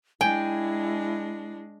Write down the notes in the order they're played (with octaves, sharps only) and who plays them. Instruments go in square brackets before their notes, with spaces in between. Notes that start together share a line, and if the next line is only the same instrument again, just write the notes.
[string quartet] G#3 D4 [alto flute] E4 [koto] G5 [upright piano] G#5